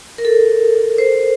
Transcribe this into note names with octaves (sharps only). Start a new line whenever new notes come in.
A#4
A4
C5